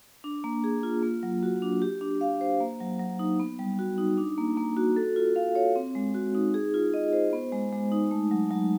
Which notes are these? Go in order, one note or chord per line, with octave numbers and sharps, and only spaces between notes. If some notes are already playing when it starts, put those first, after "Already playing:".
D4
A#3
G#4
F4
A#3
F#3
F#4
D4
G4
D4
F5
C5
A#3
F#3
F#3
D#4
B3
G3
F#4
D#4
D4
A#3
A#3
F#4
A4
F4
F5
C#5
C4
G#3
F#4
D#4
G#4
F4
D#5
C5
B3
G#3
G#3
D#4
A3
F#3
F#3